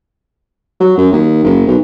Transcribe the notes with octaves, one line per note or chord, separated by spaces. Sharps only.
F#3
F#2
D#2
F#1
B1